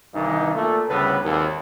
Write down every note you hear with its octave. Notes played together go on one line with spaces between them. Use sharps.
C2 G2 D#3 E3 D#4
A#2 A3
D2 A2 C#3 G3 B3 B4
G#1 D#2